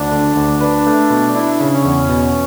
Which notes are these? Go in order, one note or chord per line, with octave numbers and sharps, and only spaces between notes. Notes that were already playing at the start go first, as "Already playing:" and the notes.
Already playing: D2 D4
D3
D2
D4 B4
A3
B2
D4 E4
C#3
C#4
E2
B2